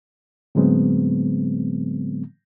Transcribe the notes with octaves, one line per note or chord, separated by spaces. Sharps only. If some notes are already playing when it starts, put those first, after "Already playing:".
A2 D3 F#3 G#3 B3 C4